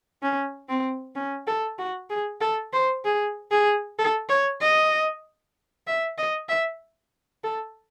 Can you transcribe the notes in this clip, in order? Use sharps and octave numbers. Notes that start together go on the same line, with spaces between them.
C#4
C4
C#4
A4
F#4
G#4
A4
C5
G#4
G#4
A4
C#5
D#5
E5
D#5
E5
A4